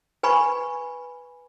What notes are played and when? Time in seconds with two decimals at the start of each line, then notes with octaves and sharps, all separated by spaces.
0.23 B4 G#5 B5 C#6